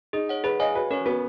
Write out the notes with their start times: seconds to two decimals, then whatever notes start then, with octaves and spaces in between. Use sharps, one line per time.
0.13 D#4 G#4
0.29 C#5 F#5
0.44 G#4 B4
0.60 C#5 D#5 F5 G#5
0.75 F#4 B4
0.91 C#4 A#4 C#5
1.06 B3 F#4